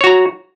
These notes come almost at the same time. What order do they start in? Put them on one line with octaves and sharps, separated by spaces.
C#5 F#4 A#5